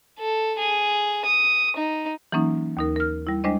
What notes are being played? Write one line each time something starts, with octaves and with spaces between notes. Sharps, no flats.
A4
G#4
D#6
D#4
E3 F#3 A#3 C#4 D#4
D#2 D#4 A#4
A#4 F6
G3 E4
G3 G#3 D4 C5 D#5